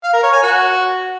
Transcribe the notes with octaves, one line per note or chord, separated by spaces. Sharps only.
F5
A#4
C#5
G#5
F#4